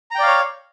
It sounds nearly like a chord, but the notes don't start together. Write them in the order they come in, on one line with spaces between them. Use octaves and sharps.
A#5 G5 D5 F5 C#5